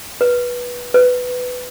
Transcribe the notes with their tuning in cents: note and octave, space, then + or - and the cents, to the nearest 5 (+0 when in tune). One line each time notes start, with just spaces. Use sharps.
B4 -15
B4 +10